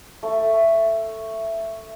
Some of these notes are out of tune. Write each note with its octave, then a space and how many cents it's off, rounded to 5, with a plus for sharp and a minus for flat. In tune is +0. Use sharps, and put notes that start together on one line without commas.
A3 +10